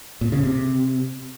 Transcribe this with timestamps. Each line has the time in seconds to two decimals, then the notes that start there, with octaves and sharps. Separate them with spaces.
0.21 A#2
0.32 C#3
0.43 C3